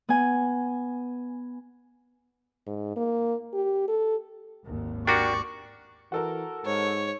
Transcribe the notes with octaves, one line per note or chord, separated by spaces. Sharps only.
B3 G#5
G#2
A#3
G4
A4
G#1 D#2
D4 F#4 G4 A#4 D5 C#6
E3 F#4 A4 A#4
G#2 C#5